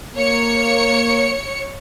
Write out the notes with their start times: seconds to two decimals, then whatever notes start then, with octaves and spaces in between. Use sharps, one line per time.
0.16 A#3 C#5 C#7